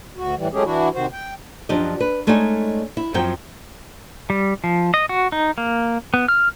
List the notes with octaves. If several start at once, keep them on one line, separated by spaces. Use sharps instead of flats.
D2 F#4
A2 E3 G3
F#3 G#3 A3 C#4 G4 G#4
E3 D4 E4 F#4
C3 D#3 F#4 C5
G5
F#2 F3 D4 G4 D#5
B4
G#3 A3 C#4 D#4 D5 G#5
E4
F#2 F3 F#3 C4 G5
G3
F3
D#5
F#4
D#4
A#3
B3
F6